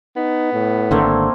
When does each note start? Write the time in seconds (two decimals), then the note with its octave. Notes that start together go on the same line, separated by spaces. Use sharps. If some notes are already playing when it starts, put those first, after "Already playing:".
0.16 B3 D#4
0.52 A2
0.91 G#1 D3 A3 A#3 C4